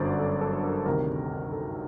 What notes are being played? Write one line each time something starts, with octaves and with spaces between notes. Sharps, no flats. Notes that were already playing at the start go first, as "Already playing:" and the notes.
Already playing: G1 F#2 D3 C5 D5
A4
A4
A#4
D2 C3 D#3 A#4
A4